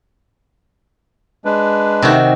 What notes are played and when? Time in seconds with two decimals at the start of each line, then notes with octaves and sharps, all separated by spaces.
1.45 G#3 D4 B4
2.02 C3 D#3 F#4